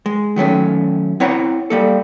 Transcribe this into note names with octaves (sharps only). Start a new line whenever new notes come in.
G#3
D#3 F#3 A3 C#4
C4 E4 C5 C#5 F#5 A#5
G3 A#3 A4